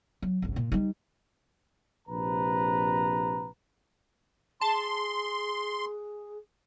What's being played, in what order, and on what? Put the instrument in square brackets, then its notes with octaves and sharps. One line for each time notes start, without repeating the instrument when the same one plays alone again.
[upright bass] F#3
G#1 C#2
A#2
G3 D#4
[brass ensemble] A#1 C3 B4 A#5
[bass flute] G#4 [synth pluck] A5 [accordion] C6